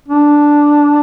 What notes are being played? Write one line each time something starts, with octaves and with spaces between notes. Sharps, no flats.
D4